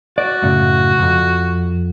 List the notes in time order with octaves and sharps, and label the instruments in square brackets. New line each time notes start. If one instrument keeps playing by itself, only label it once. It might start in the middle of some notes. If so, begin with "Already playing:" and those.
[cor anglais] F#4 [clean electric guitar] D5
[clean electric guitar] F#2 A2 C#3
B1 F2